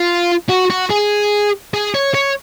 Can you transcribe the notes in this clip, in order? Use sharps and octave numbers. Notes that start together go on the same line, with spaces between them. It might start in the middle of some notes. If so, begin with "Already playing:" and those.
Already playing: F4
F#4
F#4
G#4
G#4
C#5
C#5